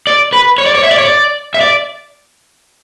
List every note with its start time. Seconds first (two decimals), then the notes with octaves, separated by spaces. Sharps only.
0.07 D5
0.33 B4
0.58 C#5
0.66 D5
0.75 C#5
0.84 E5
0.91 D5
0.98 C#5
1.05 D5
1.54 E5
1.61 D5